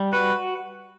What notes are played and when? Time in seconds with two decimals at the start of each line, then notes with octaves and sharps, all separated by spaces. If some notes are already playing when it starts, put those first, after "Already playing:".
Already playing: G3
0.13 F#4 B4